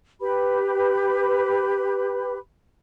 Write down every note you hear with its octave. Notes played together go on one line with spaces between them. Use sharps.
G4 B4 B5